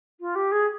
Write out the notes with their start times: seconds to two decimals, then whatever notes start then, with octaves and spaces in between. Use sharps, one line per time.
0.20 F4
0.35 G4
0.51 G#4